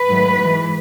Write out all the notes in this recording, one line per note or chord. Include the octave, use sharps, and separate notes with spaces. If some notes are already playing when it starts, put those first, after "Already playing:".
Already playing: B4
G#2 D#3 F#3 A3
G#2 E3 G#3